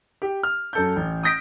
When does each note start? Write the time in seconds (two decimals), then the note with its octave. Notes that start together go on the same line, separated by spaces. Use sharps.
0.22 G4
0.43 F6
0.73 F#2 A4 G6
0.96 A1
1.23 D#6 G6 A#6 B6 D7